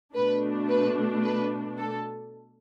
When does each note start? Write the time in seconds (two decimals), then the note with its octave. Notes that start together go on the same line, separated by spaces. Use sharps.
0.14 B2 A3 D4 B4
0.69 B4
1.23 B4
1.78 A4